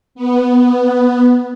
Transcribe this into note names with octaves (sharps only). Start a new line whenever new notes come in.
B3